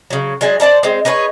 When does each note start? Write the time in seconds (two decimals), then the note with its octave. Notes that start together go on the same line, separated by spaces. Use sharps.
0.10 C#3 F#3
0.41 F#3 G#3 D4 G#5
0.60 C5 D5 A5 A#5
0.83 G#3 C4
1.05 D#4 G#4 B4 C#5